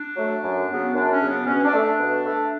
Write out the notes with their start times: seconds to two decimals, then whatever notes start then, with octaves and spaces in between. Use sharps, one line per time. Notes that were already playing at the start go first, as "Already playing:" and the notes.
Already playing: D4
0.16 F#3 A3
0.42 F#2
0.68 C#3 F#3 B3
0.94 F#2 D4
1.12 C#4
1.20 C#3 F#3 B3
1.30 D4
1.46 B2 C#4
1.64 D4
1.73 A3
1.81 D4
1.99 B2
2.25 A3